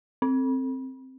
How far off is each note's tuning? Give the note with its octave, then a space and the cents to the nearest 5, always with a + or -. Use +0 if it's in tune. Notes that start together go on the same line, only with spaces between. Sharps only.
C4 +5